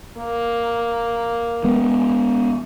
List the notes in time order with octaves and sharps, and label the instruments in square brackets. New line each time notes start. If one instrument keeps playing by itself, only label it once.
[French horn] A#3
[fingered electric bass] G#3 B3